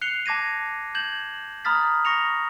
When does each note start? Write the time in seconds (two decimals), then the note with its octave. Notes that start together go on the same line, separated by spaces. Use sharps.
0.01 F#6 C7 C#7 F7 G7
0.26 A5 D6 G#6 A#6 D#7
0.95 G6 G#6 E7 F#7
1.65 A#5 B5 D#6 F6 A6 B6
2.05 C#6 A#6 C#7 F7